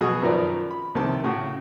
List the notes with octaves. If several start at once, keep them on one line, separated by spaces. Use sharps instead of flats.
B2 F#3 F#4 G#4 D#6
F#2 D#3 F3 A#4 B4 D5
B5
C2 C3 D#3 A5
A2 C#3 F#4